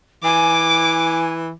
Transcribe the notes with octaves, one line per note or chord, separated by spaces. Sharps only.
E3 G#5 D6